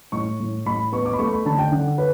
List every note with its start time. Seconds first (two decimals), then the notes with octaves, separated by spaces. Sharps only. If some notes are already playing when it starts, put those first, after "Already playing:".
0.12 A2 C#6
0.40 A2
0.66 A2 B5
0.92 B3 C#6
1.05 D6
1.13 B5
1.18 A3 C#6
1.33 B5
1.45 D3 A5
1.58 G5
1.72 D3 F#5
1.98 B4